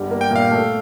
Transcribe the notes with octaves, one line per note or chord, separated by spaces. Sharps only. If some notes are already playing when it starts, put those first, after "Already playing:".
Already playing: G1 G3
A#3
G5
A#2 F5
A3